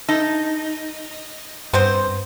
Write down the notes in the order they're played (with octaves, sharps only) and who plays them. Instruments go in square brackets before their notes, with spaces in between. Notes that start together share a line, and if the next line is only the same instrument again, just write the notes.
[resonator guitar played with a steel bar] D#4 [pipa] A4
[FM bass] G2 [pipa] B3 C4 C5